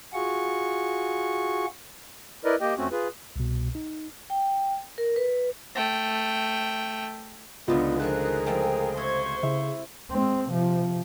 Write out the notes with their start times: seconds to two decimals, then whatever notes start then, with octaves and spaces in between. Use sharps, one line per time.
0.13 F4 F#4 G#4 C#6
2.45 E4 A#4 B4 D5 D#5
2.61 A#3 G4 D#5 G5
2.77 F2 A3 C4 C#4 F#4
2.92 F4 G#4 B4
3.36 C2 B2
3.75 D#4
4.30 G5
4.98 A#4
5.16 B4
5.75 A3 G5
7.68 C#2 B2 D3 B3 D4 D#4 F4
8.00 D#3 F3 A3 G#4 A#4 F#6
8.46 F3 G#3 A3 G5
8.97 C3 C5 C#6 G#6
9.43 C#3 E4
10.11 G#3 C4
10.50 C3 F3